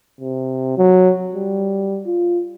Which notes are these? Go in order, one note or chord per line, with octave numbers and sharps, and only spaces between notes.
C3
F#3
G3
F4